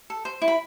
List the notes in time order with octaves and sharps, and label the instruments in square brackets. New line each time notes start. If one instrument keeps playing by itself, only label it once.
[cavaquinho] A4
C5
E4
B5